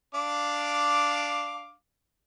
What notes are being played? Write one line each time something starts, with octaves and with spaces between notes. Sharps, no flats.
D4 F5 D6